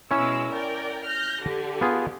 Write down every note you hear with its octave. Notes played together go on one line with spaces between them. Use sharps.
B2 G#3 C#4 E4 C#5 E6
A#4 D5 G5
F6 G6 A#6
D3 G4
B3 F4 G#4